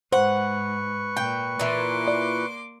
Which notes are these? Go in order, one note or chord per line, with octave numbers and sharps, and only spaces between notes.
G#2 B4 C5 F#5 C#6
A#2 G5
A#2 E3 A#3 C6 D6
D5